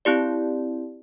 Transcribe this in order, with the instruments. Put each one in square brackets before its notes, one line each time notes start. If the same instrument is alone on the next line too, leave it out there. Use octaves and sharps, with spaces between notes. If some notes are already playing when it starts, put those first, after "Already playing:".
[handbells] C4 E4 G4 D5